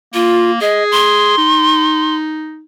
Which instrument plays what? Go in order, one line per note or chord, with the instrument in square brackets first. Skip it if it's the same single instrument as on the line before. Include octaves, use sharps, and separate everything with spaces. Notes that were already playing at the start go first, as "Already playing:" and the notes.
[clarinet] A#3 [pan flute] F4
[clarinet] G#4 [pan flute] D#5
[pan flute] C6
[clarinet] D#4